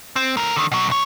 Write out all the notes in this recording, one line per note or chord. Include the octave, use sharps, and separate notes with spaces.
C4
A3 A#4
D3 D#3
B2 F#3
B1 C#5